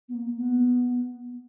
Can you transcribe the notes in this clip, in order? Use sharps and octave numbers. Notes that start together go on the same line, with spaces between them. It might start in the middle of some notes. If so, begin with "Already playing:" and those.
B3
A#3
B3